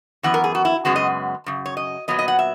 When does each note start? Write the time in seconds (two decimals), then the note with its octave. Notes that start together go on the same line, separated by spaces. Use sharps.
0.23 F#2 E3 B3 F#5
0.34 A#4
0.44 G#4
0.55 F#4
0.65 E4
0.85 F#2 C#3 G#3 B3 F#4
0.96 D#5
1.46 F#2 C#3
1.66 C#5
1.77 D#5
2.08 A#2 F#3 B3 D#5
2.19 D#5
2.28 F#5
2.39 E5